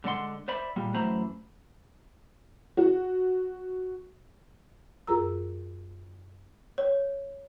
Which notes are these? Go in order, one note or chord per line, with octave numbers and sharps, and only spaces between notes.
D3 G#3 D5 F#5 C6
C5 D5 E5 B5
A#2 G3 G#3
F#2 E3 A3 C5 A#5 B5
F#4
F#2 F4 G#4 A#4 A#5 E6
C#5